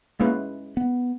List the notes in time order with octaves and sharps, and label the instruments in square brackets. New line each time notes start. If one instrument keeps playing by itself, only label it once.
[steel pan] G#3 C#4 E4 B4 [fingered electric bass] A#3
[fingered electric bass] B3